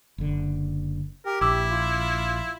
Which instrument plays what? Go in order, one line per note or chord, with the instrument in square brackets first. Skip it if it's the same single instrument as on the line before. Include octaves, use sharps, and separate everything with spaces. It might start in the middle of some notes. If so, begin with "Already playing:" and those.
[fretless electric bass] F#1 D3
[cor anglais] G4 [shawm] A#4
[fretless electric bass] A#1 [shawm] E4 [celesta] D6 E6
[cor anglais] F4